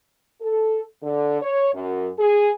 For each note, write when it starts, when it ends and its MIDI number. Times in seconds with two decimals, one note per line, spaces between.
0.42 0.82 69
1.03 1.41 50
1.42 1.70 73
1.74 2.11 42
2.19 2.50 68